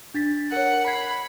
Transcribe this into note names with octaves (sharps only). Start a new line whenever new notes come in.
D4 A6 B6
A#4 C#5 F#5
B5 G#6 C7